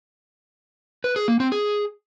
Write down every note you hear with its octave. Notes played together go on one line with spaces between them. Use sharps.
B4
G#4
A#3
C4
G#4